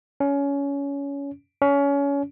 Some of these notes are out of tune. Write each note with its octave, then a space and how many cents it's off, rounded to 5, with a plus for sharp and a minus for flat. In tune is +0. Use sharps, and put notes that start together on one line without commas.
C#4 +20
C#4 +25